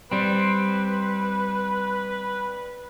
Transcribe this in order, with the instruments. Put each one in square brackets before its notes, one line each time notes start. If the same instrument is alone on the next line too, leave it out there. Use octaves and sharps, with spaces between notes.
[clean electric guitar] G3 C4 [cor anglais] B4